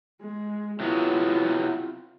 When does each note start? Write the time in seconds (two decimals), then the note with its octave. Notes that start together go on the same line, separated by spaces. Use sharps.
0.21 G#3
0.80 C3 F#3 B3 E4 F4